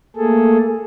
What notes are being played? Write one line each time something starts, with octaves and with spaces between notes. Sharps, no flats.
A3 A#3 G#4 A4